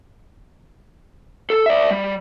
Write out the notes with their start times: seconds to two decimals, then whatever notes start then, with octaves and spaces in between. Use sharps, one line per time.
1.50 A4
1.66 D5 E5
1.91 G3